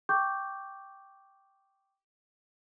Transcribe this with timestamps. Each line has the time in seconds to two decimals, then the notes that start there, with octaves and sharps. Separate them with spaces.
0.09 G5 C#6 D6 G6